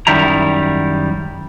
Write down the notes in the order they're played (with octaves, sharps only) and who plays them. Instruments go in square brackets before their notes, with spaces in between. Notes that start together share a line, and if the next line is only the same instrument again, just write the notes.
[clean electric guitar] F#2 D#3 G3 E4 A#5